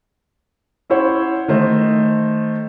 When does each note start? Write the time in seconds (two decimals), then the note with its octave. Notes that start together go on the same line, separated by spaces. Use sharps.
0.90 C#4 E4 C5 C#5 F#5
1.48 D#3 A3 C5 D#5